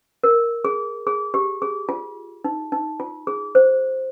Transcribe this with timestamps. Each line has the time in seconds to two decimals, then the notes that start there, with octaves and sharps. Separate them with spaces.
0.23 A#4
0.65 G#4
1.07 G#4
1.34 G4
1.62 G#4
1.89 F4
2.44 D#4
2.72 D#4
3.00 F4
3.27 G#4
3.55 C5